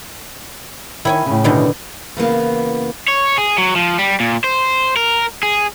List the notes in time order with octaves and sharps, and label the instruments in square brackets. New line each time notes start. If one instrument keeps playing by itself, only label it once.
[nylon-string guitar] D#3 [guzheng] E4 C#5 G#5
[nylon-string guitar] A2 C#3
[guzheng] B2 D3 D#3
[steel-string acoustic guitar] C#3 E3 A#3 B3
[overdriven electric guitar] C#5
G#4
F#3
F3
G3
A#2
C5
A#4
G#4